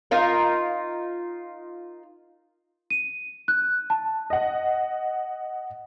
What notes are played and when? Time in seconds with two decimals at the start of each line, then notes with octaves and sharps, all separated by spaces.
0.11 D#4 F4 A#4
2.90 D#7
3.48 F#6
3.90 A5
4.30 D#5 F#5